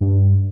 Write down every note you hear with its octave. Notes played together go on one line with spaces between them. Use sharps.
G2